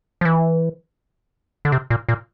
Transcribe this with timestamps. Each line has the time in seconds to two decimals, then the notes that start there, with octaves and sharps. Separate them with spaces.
0.21 F3
0.25 E3
1.65 D3
1.72 C3
1.90 A#2
2.09 A#2